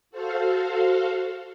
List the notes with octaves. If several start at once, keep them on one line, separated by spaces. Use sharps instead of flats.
F#4 A4 C5 F5